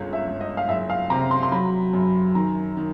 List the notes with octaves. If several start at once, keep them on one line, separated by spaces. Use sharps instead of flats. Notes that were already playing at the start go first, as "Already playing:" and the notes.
Already playing: G1 C#2
E5
G1
D#5
F5
F#1 E5
F5
C3 A#5
C6
C6
F#3 B5
F#2
D#3 A#5
D#3